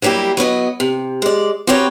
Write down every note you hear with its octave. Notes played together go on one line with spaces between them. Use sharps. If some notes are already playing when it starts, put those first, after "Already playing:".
F#3 G3 A#3 E4 G4
F#3 B3 C#5 D#5
C3
G#3 D5
C4 F#4 G4 B4 C#5 A#5